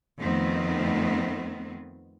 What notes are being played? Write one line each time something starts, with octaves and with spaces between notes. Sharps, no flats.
F2 D#3 A3 B3 C4